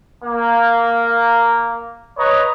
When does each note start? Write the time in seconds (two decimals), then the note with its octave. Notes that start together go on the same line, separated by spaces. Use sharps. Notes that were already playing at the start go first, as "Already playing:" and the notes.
0.24 A#3
2.18 B4 C#5 D#5 A#5 B5 C#6